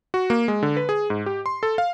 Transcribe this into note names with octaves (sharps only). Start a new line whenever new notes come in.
F#4
A#3
G#3
D3
B4
G#4
G#2
G4
C6
A4
F5